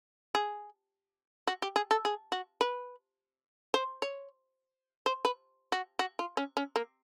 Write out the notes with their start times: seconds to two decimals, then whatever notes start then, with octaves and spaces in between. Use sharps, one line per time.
0.35 G#4
1.47 F#4
1.62 G4
1.76 G#4
1.91 A4
2.05 G#4
2.32 F#4
2.61 B4
3.74 C5
4.02 C#5
5.06 C5
5.25 B4
5.72 F#4
5.99 F#4
6.19 F4
6.37 C#4
6.57 C#4
6.76 A#3